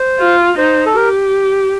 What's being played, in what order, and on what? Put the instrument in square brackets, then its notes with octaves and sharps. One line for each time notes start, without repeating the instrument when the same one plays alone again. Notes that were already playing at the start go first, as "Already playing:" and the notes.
Already playing: [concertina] C5
[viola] F4
[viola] D#4 [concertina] C5
[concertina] A4
[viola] G4 [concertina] A#4